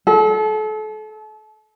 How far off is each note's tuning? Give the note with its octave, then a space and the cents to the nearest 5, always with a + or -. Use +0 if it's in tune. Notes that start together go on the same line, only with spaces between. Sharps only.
A4 -35